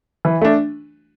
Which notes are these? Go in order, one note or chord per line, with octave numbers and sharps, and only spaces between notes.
E3
A3 D4